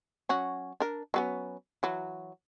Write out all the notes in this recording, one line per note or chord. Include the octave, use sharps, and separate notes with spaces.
F#3 C#4 F#4
D4 A#4
F#3 B3 C#4
E3 F#3